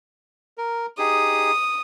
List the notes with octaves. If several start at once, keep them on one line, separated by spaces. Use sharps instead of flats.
A#4
D#4 G4 G#4 D#6